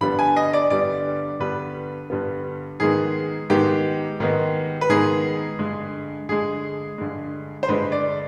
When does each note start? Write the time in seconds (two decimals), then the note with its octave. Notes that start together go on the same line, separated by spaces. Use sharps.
0.01 G2 D3 G3 B3 B5
0.19 G#5
0.36 D#5
0.53 D5
0.70 G2 D3 G3 B3 D5
1.40 G2 D3 G3 B3 B4
2.10 G2 D3 G3 B3
2.80 G#2 D#3 G#3 B3 G#4
3.50 G#2 D#3 G#3 B3 G4
4.20 G#2 D#3 G#3 B3
4.81 B4
4.89 G#2 D#3 G#3 B3 G#4
5.59 G2 D3 G#3
6.29 G2 D3 G#3 G#4
6.98 G2 D3 G#3
7.63 C5
7.68 G2 D3 G#3 B4
7.92 D5